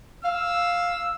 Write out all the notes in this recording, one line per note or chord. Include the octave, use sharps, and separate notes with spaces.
F5 E6